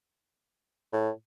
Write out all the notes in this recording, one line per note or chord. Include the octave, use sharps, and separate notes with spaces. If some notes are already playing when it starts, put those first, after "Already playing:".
A2